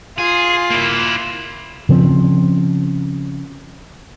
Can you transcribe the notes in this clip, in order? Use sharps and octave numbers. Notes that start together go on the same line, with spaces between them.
F4 G#4
A#3 E4
C#3 F3 C4